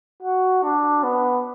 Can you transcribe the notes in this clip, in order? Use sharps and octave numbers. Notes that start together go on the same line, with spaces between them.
F#4
D4
B3